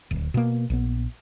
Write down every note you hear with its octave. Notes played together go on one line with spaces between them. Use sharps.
D1
B2 A#3
A#1 B3